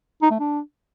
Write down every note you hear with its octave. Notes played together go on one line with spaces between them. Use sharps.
D#4
A3
D4